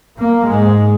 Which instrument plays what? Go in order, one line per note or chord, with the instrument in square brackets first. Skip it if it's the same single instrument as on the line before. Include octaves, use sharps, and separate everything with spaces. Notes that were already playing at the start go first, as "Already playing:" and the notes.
[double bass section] A#3
G#2 G#3